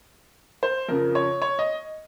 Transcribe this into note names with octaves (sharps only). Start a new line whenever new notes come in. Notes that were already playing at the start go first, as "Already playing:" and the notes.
C5
F2 C#3 F3 A#4
C#5
C#5
D#5